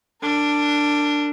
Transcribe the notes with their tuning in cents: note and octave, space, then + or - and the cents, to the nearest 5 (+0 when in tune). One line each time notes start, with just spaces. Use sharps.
D4 +0 A#4 -35